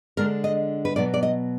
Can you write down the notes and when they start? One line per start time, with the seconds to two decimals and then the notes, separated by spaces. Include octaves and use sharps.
0.17 D3 G#3 D4 A#4
0.44 D#5
0.85 B4
0.96 B2 F#3 B3 D5
1.14 D5
1.23 D#5